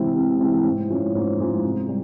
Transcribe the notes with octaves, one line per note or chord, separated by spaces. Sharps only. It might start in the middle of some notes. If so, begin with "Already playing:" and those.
Already playing: C3 E3 G#3 C4 E4
C3
E3 G#3 C4 E4
G#2
F3 G#3 C#4 E4
G#2
F3 G#3 C#4 E4
C3
G3